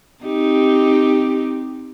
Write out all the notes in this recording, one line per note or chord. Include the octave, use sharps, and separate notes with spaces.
C4 D#4 G4